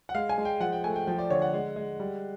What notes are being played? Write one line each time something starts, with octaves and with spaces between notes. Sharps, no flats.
F#5
G#3 F5
G#5
G#3
G5
F3 F#5
G5
A3 G#5
G5
F3 G5
D5
D3 C#5
F#5
G#3
G#3
G3